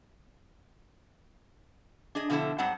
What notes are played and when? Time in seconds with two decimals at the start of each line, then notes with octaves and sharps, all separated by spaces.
2.15 D4 G#4 D#5
2.30 B2 D3 F3 B3 E4 A4
2.58 G#2 F#3 G3 C4 F#5 A5